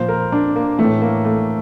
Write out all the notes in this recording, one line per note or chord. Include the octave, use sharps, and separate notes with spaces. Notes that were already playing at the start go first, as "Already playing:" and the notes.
Already playing: A#2 F3 C5
A#4
D4
A#3
A2 E3 A3
A#3
A3